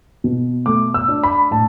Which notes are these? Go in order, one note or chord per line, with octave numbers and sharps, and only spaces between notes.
B2
A3 D6
E6
D4
B5
A2 A5